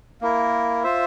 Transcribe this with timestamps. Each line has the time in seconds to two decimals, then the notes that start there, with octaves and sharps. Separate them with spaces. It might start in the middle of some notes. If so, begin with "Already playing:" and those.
0.21 A#3 E4 A#4
0.83 F4 C5 E5